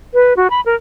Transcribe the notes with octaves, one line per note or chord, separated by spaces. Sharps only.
B4
F#4
B5
A#4